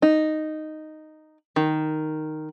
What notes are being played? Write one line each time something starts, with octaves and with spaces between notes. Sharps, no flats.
D#4
D#3